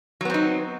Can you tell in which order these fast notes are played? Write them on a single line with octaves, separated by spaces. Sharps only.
F#3 B3 C4 D#4